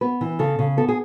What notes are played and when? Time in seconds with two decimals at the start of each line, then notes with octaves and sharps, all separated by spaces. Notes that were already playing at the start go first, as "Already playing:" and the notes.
0.01 B3 B4
0.21 E3
0.39 C#3 A4
0.59 C#3
0.77 B3 A4
0.88 G#4